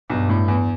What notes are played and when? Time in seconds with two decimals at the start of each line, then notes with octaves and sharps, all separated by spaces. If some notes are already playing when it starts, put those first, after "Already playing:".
0.10 B1 G2
0.29 A2
0.48 E2